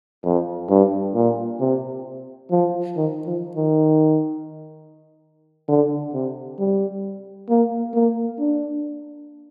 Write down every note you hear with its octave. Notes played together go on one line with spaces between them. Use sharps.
F2
G2
A#2
C3
F3
D#3
F3
D#3
D3
C3
G3
A#3
A#3
D4